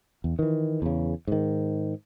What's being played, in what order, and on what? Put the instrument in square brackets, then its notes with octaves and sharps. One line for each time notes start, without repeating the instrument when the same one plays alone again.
[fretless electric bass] E2
D#3 E3
E2 C#3
G#2 D#3